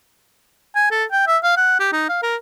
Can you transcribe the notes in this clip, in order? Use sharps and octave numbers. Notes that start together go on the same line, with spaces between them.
G#5
A4
G5
E5
F5
F#5
G4
D#4
F5
A#4